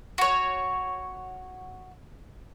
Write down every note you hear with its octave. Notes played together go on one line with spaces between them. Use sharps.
F#4 C#5